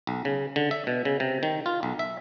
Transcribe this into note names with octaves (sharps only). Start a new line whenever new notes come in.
B1
C#3
D3
E5
B2
C#3
C3
D#3
F4
B1
E5